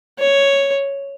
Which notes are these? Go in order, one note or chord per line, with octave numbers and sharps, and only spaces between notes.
C#5